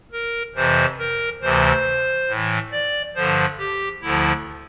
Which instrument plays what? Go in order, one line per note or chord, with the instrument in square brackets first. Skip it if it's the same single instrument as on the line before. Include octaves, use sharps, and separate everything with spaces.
[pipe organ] A#4
F2 C3 E3 C5
A#4
D2 C3 E3 C5
A2
E3
D5
G2 D3 F3 C5
G4
D2 D3 F3 E4